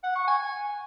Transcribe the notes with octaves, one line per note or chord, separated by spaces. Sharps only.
F#5
C#6
G#5